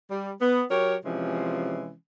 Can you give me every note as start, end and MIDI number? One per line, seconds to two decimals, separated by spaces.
0.10 0.31 55
0.41 0.62 59
0.70 0.94 54
0.70 0.94 67
0.70 0.94 70
0.70 0.94 73
1.04 1.93 48
1.04 1.93 52
1.04 1.93 53
1.04 1.93 56
1.04 1.93 61